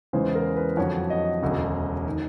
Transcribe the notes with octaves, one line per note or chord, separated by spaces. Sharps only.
E2 C#3 E3 G#3 B3 C5
A#4
B4
F2 D3 F#3 C#5
D#5
E1 D2 C#3
D#3